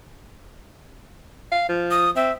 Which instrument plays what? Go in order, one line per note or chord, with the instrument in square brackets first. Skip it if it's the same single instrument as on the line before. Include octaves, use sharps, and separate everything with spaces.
[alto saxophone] F5
F3
[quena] D#6
[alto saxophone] C4 [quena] E5